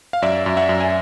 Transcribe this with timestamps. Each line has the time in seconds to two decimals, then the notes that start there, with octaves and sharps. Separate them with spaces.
0.13 F5
0.22 F#2 D5 E5
0.46 F#2
0.57 E5 F#5
0.69 F#2
0.81 G#5